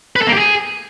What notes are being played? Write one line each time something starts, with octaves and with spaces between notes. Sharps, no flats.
B4
A4
A#3
G4
G#4